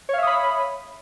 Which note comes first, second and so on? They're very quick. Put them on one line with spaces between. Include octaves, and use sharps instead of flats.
C#5 F5 E5 D#6 B5